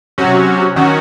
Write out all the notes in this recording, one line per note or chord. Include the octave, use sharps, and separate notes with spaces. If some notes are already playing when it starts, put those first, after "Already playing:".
C3 F#3 C#4 F#4
D#3 F#3 C#4 F#4